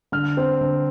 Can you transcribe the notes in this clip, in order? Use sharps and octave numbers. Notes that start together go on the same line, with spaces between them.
D3 F6
C4
D3